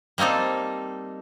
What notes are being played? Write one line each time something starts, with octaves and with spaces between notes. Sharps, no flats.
G3 A#3 C4 D#4 A4